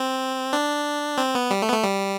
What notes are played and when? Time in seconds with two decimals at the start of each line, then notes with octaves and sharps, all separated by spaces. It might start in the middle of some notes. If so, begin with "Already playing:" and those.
Already playing: C4
0.53 D4
1.18 C4
1.35 B3
1.51 G3
1.62 A3
1.69 B3
1.73 A3
1.84 G3